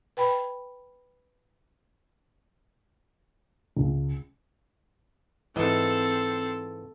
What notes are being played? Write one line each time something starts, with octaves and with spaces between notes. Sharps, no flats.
B4 G5 B5
C#2
G#2 E3 C4 A4 D#5